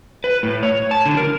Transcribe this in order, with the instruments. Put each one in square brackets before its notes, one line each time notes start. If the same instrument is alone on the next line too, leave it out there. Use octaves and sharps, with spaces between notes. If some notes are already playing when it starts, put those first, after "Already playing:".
[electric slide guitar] B4
A2
C#5
A5
D3
A#4